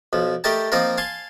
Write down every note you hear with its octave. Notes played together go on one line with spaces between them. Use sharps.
B1 F3
A3 G4 A#4 D#5 G5 A5
F3 A#3 C4 D#4 F4 A#4
F5 G#5 A5 C6